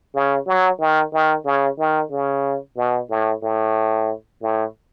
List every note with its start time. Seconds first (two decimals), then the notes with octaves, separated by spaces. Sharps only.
0.15 C#3
0.47 F#3
0.80 D#3
1.13 D#3
1.45 C#3
1.79 D#3
2.11 C#3
2.77 B2
3.10 A2
3.43 A2
4.42 A2